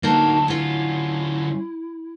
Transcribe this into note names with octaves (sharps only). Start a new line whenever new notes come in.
D3 F#3 A#3 D#4 F#4 A5
C#4 E4 F4